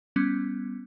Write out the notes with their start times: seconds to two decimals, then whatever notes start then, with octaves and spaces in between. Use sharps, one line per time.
0.16 G3 B3 C#4